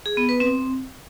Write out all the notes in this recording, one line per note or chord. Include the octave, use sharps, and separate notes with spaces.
G#4
B3
B4
C4